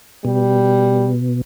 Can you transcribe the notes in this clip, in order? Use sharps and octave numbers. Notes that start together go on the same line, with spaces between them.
B2 G3